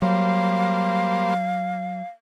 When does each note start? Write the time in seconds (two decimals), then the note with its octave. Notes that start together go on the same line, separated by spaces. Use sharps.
0.02 F#3 G3 A#3 C5 F5